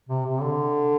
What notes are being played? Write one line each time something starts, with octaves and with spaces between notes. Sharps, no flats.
C3
C3
D3